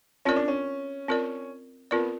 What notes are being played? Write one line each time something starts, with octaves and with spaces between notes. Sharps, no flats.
C4 C#4 F4 A#4 D5
D4
C#4
C4 F4 A#4 D5
B3 C4 F4 A#4 D5